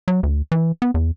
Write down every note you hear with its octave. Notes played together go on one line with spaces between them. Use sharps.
F#3
D2
E3
B3
E2